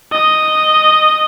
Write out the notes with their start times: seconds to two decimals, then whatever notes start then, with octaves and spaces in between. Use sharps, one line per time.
0.12 D#5